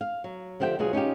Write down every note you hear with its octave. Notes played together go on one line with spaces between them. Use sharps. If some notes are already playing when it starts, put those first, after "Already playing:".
F5
F#3
D3 F3 G4 E5 G5
D2 B2 F#3 F4 G#4
C#4 D#4 F4 G4